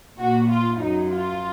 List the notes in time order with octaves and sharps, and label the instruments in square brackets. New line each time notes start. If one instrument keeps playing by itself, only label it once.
[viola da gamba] A#2 A#3 [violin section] F#4
[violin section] F4
[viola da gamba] F#2 F#3 [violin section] D#4
[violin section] F4